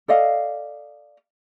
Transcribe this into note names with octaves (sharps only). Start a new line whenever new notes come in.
A4 D5 D#5 F5